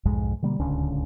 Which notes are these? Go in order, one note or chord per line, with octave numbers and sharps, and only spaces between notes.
B1 F2 G#2 G#3
B2 D3 G3 A#3
D1 C#2 D3 C#4